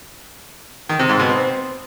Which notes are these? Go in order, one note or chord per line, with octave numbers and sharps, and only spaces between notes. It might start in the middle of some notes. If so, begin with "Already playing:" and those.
D#3
C3
G#2
B2
C4